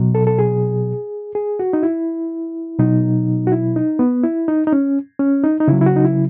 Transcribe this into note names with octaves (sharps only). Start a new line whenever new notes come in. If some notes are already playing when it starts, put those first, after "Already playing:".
Already playing: B2 F#3
A4
A4
G#4
G#4
F#4
D#4
E4
B2 F#3 D#4
F#4
E4
D#4
B3
E4
D#4
D#4
C#4
C#4
D#4
D#4
C#3 F#3 E4
E4
F#4
D#4
E4